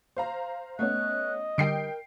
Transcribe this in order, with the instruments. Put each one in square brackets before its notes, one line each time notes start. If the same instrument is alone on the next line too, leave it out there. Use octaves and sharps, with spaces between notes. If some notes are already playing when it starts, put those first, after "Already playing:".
[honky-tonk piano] C5 F5 A#5
[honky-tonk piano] A3 B3 C#4 [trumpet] D#5 [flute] F#6
[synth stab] D3 G3 [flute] A#4 [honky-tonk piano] G5 C7 D7